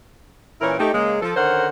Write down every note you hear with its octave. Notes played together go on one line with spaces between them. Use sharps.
A#2 E3 C#4 E4 A#4
A3 D#4 G4
C#3 G#3 A#3
F3 A4
D3 D#3 C#4 A#4 C5 F#5